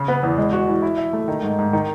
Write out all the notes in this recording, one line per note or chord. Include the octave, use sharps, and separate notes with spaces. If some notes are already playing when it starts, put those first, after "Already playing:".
Already playing: C#3
B3
E2
G#3
F#4
E3
E4
E5
A3
D#3
G#2
G#2
D#3